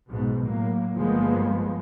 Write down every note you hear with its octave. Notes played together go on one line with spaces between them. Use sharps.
B1 G#2 B2
A2 F#3 A#3
G1 G2 F3 G#3 A#3 B3